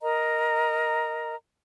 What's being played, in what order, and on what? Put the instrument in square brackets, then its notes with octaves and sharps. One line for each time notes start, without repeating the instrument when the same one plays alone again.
[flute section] A#4 D#5 A#5